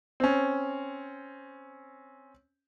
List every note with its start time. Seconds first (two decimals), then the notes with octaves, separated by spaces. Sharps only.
0.20 C4 C#4